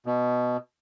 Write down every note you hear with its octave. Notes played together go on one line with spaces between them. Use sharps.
B2